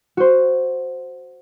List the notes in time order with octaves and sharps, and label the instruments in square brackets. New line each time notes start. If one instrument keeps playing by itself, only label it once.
[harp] F#4 C5